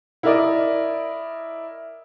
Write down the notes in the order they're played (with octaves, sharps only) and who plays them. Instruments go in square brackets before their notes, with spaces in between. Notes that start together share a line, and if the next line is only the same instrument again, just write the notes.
[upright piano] E4 A#4 D5 D#5